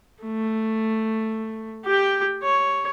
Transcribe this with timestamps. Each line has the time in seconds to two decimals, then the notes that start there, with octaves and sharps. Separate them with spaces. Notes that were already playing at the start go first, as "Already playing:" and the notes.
0.24 A3
1.85 G4 G5
2.43 C#5